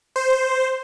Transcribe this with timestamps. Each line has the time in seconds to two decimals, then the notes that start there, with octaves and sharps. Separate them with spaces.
0.16 C5